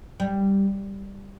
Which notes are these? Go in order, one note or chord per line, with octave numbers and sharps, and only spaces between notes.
G3